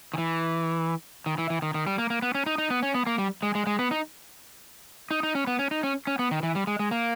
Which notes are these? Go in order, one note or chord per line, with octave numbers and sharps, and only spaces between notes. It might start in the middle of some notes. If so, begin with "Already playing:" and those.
D#3
E3
D#3
E3
E3
D#3
D#3
G3
A#3
A#3
B3
C#4
D#4
D#4
B3
C#4
B3
A#3
G3
G#3
G#3
G#3
B3
D#4
D#4
D#4
C#4
B3
C#4
D#4
C#4
C#4
B3
D#3
E3
G3
G#3
G#3
A#3